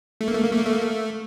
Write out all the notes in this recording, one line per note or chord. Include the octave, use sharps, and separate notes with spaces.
A3
A#3
A3
A#3
A3
A#3
A3
A#3
A3